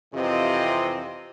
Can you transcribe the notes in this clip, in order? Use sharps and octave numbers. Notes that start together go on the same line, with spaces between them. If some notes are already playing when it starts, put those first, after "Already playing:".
F2 C3 E3 C4 F4 D#5